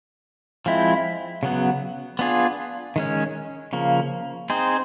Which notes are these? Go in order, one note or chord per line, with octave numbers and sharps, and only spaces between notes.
F3 G#3 C4 E4
C#3 F#3 B3
B3 D4 F4 G#4
D#3 G#3 C#4
C#3 F3 A#3
C4 D#4 G#4 C5